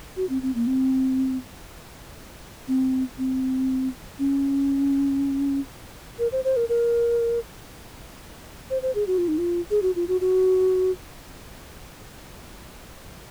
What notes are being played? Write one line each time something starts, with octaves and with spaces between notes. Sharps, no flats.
F#4
C4
C4
A#3
C4
C4
C4
C#4
A#4
C5
C5
A#4
A#4
C5
C5
G#4
F#4
F4
D#4
F4
G#4
F#4
F4
F#4
F#4